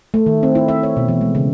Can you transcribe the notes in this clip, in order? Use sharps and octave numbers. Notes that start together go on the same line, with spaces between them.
A3
D#3
C4
E4
E5
C#5
B2
E3
G#3
C#3